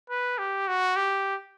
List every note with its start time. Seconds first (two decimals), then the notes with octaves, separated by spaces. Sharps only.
0.10 B4
0.38 G4
0.68 F#4
0.96 G4